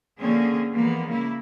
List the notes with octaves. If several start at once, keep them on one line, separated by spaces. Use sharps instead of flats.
D3 F3 A#3 C4 C#4 G#4
E3 F3 G#3 A#3 B3
C#3 A#3 E4